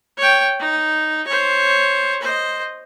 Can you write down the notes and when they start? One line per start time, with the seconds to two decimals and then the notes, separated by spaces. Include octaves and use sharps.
0.18 C#5 G5
0.60 D#4
1.27 C5 C#5
2.22 C5 D#5